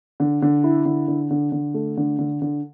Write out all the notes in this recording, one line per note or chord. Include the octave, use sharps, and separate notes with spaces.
D3
D3
E4
D3
D3
D3
D3
A3
D3
D3
D3